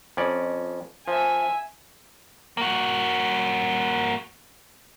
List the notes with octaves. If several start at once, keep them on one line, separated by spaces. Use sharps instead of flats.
F2 C#4 D5
F3 E5 G#5
A#3 F#4